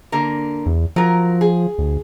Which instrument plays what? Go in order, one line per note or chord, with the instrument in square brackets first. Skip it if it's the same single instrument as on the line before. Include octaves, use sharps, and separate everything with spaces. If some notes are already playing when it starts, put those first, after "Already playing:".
[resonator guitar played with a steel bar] D3 A#3 A#4
[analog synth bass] E2
[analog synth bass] F3 [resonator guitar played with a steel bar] F#3 A#4
[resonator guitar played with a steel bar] G#4
[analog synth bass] D2